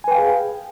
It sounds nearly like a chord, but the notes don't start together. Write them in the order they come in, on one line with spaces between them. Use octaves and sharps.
G#5 B4 G5 F5 G#4